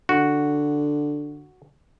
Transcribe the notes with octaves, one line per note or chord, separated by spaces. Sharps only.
D3 F#4